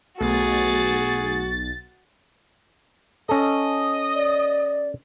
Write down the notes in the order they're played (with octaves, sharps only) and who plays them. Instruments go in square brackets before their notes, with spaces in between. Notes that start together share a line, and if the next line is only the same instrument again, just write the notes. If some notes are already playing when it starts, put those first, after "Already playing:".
[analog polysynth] B1 A6 [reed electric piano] A3 B3 [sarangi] F#4 [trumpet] G#4
[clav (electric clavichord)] C#4 A4 [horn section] D#5
[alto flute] D5